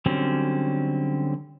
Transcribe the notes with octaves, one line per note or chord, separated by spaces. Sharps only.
D3 F#3 G3 C4 C#4